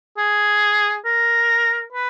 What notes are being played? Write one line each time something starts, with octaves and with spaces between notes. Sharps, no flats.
G#4
A#4
B4